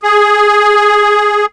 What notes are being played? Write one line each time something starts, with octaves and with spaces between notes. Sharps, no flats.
G#4